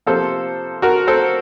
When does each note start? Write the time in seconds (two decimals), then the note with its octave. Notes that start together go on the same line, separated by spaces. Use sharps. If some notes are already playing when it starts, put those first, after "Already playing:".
0.07 C3 F3 A#3 A4 C5
0.82 F#4 A#4
1.07 A4 C5